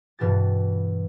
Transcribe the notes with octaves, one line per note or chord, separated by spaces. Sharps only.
G2 B2 E3 G4 A6